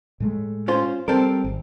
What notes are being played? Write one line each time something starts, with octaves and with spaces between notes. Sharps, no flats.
A2 G#3 A3
C#4 F4 C5
G3 C4 A4 A#4
G#1